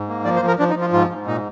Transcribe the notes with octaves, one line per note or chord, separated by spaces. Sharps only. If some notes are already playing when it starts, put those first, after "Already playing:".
Already playing: G#2
A#3
F3 D5
C5
F3
A#4
F3 D4
D#4
F3
F4
G#2 F4
G#2
A#2 D#4